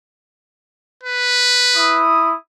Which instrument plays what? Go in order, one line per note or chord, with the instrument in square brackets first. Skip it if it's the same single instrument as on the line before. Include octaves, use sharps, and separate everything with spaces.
[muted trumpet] B4
[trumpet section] E4 D#6